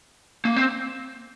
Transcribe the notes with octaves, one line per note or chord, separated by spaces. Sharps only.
A#3
C4